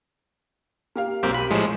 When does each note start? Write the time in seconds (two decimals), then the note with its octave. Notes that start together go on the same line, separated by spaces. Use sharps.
0.95 A#3 G4 F5
1.23 B1 A#3 C4 G4
1.34 G4 B5 D#7
1.50 A2 F3 G#3 A#4 C#5 E7